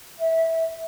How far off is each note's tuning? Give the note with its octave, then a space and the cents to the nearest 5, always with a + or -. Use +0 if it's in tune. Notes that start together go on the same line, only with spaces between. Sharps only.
E5 -15